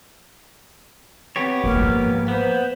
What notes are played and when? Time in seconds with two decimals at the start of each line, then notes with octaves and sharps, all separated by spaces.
1.36 B3 C4 G4 C#5
1.64 G1 A#3 A#4
1.76 G#2 F3
2.28 B3 C5